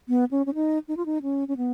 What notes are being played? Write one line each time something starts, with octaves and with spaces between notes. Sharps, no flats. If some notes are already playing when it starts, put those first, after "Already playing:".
B3
C#4
C#4
D#4
D#4
F4
D#4
C#4
C#4
B3